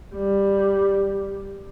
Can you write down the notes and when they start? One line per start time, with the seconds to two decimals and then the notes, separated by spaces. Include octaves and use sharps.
0.15 G3